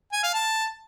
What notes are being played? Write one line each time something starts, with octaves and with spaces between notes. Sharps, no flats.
G#5
F5
A5